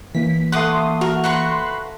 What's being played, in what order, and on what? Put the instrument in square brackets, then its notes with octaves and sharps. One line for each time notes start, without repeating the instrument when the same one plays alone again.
[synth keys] E3 A#3 [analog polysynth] B6
[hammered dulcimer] A3 F5 [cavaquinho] F#5 D6 [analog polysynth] C6 D#6
[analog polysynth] F#4 [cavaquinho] A#4
[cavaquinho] F#4 B4 C#6 [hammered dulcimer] A#5 [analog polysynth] C6 F#6